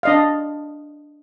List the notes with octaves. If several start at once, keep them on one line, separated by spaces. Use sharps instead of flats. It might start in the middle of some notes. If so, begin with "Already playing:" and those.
D4 D#5 F5